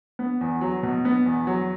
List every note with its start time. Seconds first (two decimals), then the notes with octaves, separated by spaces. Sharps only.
0.19 B3
0.41 E2
0.61 F#3
0.83 B2
1.05 B3
1.26 E2
1.47 F#3